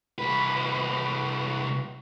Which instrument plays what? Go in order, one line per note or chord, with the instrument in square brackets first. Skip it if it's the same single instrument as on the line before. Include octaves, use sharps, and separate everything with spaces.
[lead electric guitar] C2 B4